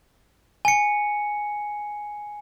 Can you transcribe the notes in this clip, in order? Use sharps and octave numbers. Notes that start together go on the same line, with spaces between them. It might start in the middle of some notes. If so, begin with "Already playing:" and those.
G#5 C#7